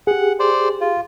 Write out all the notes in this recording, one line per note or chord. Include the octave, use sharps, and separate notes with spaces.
G4 G#4 F#5
C5 D5
F4